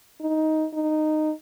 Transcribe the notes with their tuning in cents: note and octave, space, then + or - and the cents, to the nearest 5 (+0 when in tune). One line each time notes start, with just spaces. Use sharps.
D#4 +10
D#4 -15